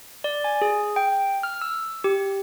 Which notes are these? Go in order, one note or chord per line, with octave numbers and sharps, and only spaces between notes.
D5
G#5
G#4
G5
F6
E6
G4